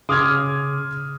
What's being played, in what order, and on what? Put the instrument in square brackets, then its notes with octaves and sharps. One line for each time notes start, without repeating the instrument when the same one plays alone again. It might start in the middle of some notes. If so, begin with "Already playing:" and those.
[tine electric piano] C#3 C6 D6 [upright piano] D#6 F6 G#6